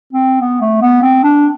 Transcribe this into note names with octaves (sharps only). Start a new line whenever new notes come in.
C4
B3
A3
B3
C4
D4